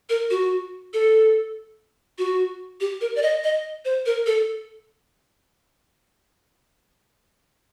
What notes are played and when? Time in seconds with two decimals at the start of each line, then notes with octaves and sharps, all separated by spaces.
0.09 A#4
0.30 F#4
0.93 A4
2.18 F#4
2.80 G4
3.01 A#4
3.16 D5
3.23 D#5
3.44 D#5
3.85 C5
4.06 A#4
4.26 A4